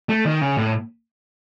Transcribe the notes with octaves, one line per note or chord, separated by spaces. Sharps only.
A3
D#3
C#3
A2